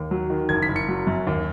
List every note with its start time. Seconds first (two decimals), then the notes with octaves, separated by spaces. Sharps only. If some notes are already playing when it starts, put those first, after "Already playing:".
Already playing: D#2
0.11 F#3
0.30 D#3
0.49 F#1 G#6
0.63 B6
0.68 F#1
0.76 C#7
0.88 F#3
1.07 F#2
1.27 D#2